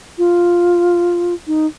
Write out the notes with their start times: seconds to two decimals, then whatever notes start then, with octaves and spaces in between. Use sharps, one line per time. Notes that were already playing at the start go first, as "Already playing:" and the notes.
0.18 F4
1.47 D#4